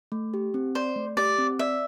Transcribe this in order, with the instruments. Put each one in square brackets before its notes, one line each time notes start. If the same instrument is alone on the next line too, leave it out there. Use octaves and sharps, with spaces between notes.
[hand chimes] A3
G4
C4
[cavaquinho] C5 [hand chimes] D5
[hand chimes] A3
[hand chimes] G4 [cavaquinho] D5
[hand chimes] C4
[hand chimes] D5 [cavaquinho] E5